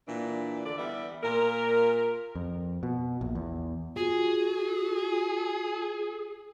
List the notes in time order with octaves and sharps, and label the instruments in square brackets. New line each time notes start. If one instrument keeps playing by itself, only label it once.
[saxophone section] A#2 E3 D4
D2 D3 D5
E3 G3 B3 D5 E5
A#2 A#4
[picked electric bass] F2
B2
A#1
E2
[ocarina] F4 [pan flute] F#4 [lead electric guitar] G#4